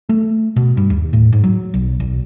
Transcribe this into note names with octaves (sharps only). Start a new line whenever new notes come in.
A3
B2
G2
D#2
A2
G#2
F#3
B1
B1